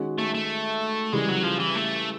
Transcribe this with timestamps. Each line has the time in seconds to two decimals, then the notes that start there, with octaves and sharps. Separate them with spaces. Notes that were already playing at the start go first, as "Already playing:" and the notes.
Already playing: D#3 G#3 C#4 F#4
0.18 A3
0.34 A3
1.12 C#3 E3 G3 G#3
1.29 F#3
1.43 F3
1.59 E3
1.75 A3